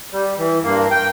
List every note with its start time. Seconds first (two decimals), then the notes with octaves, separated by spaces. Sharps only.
0.13 G3
0.38 E3
0.63 G2 A#3
0.91 G5